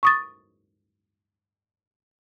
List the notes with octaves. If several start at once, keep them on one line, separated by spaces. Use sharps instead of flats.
C#6 D#6 A6